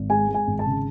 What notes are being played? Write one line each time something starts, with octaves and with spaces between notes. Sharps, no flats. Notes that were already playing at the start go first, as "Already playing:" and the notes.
Already playing: G#1
G#3 G#5
G#3
G#5
G#1
A5
C#3